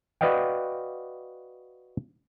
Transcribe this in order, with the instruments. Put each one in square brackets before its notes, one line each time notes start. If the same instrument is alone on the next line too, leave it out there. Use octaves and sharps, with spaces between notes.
[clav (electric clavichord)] F#4 B4 D5 D#5 F5 G5